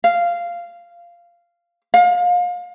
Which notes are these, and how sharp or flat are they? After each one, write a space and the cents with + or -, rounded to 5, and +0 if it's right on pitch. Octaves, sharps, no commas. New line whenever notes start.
F5 -10
F5 +30